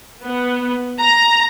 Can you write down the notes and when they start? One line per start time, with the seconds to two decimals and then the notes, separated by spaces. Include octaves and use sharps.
0.24 B3
1.00 A#5